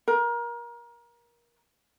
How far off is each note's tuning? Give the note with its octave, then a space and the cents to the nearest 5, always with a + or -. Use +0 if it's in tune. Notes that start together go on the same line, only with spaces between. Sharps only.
A#4 +25